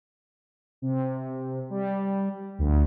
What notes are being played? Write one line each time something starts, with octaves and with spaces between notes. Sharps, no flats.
C3
G3
D2